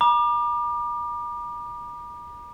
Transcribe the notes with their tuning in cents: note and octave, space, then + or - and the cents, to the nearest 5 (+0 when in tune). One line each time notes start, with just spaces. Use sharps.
A#5 +45 D6 +35